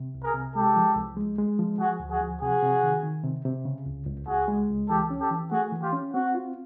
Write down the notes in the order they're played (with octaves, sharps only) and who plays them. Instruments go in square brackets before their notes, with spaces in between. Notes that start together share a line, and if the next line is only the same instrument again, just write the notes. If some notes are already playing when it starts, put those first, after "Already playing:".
Already playing: [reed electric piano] C3
C2
[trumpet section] G#4 A#4
[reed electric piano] C3
[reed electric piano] G#3 [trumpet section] G4 A4
[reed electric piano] F3
C2
G#3
G#3
F3
[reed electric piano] F3 [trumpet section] F#4 G#4
[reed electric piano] D2
[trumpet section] F#4 G#4
[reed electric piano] F3
[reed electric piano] C3 [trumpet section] F#4 G#4
[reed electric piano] C3
D#3
D#3
C3
C3
C#3
C#2
C#2
[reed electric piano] C#2 [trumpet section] F#4 G#4
[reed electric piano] G#3
C#2
[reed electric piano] E3 [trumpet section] G4 A4
[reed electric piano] C#4
[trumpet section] G4 A4
[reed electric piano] E3
[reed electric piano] A3 [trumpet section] F#4 G#4
[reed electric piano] E3
[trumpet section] F4 G4
[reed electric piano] C#4
[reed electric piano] C4 [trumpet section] F#4
[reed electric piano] F4